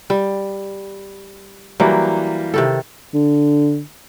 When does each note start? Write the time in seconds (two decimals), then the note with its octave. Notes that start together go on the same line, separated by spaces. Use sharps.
0.10 G3
1.80 E3 F#3 G3 A#3
2.54 C3 D#3 A4
3.14 D3